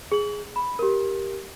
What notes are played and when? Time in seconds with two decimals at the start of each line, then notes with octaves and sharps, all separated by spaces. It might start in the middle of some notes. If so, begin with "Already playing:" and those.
0.12 G#4 F#7
0.56 B5
0.79 G4 A#4